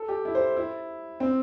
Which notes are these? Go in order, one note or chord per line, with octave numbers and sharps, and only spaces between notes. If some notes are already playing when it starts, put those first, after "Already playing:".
Already playing: A4
G4
E4
C5
E4
C4